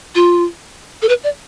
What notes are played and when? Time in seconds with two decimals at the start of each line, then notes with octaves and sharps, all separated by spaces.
0.15 F4
1.02 A4
1.09 B4
1.23 D5